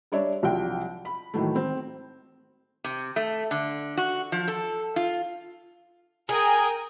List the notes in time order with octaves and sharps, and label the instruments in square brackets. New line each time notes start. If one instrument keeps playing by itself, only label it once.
[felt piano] G3 D4 C#5 D5 E5
C2 F3 F#3 G5
B5
A2 D#3 E3 F#3 A3
C4
[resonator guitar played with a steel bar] C3
A3
D3
F#4
F3
A4
F4
[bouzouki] G#4 [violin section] A#4 G5 G#5